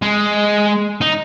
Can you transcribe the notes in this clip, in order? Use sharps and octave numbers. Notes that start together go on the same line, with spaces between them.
G#3
D#4